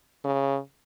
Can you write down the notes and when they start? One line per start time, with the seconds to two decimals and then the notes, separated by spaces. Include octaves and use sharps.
0.24 C#3